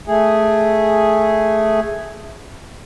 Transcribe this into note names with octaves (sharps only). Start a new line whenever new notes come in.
A3 G#4